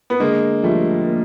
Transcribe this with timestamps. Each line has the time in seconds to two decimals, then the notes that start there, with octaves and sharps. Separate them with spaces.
0.10 B3
0.20 D3 G#3 A#3
0.63 F3 G3 A3
1.07 A#3